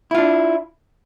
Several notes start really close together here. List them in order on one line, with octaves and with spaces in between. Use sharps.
E4 F4 D4